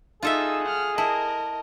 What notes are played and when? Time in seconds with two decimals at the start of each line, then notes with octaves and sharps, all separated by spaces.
0.23 D#4 F4 G#4 A4 E5 E6
0.64 F#5 F6
0.98 E4 A#4 D#5 A5